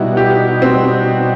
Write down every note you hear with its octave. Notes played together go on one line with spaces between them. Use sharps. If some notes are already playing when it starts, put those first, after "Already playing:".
Already playing: B2 G3 D#4 E4 F#4
G4
C4